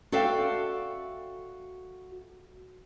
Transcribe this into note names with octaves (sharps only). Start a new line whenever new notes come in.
F#4 A4 D5 E5 F5 G5